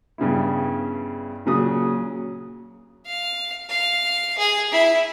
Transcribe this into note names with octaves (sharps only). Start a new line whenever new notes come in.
G2 C#3 B3 E4
A#2 C#3 F#3 D#6
F5
F5
G#4
E4